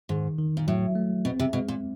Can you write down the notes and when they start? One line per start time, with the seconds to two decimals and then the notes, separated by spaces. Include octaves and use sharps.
0.09 G#2 D#3
0.38 D#3
0.57 A#2
0.68 A2 F#3
0.95 A3
1.25 B2 C4
1.39 C3
1.53 B2 G#3
1.68 A#2